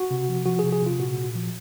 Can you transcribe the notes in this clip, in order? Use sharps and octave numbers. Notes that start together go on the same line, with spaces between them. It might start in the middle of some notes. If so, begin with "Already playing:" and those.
Already playing: F#4
C3
F3
F3 F#4
G#4
C3
G#4
C3 F4
A#2 F#4
A#2
F3